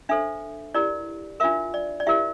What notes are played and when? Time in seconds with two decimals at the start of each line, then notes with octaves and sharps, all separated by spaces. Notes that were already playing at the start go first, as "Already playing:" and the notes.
0.09 D4 A4 C5 E5
0.74 E4 G4 A#4 D5
1.40 D4 F4 A#4 E5
1.74 D5
2.00 D5
2.07 E4 G4 A#4 E5